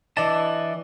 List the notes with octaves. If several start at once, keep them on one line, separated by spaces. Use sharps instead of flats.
E3 D4 D#5 A5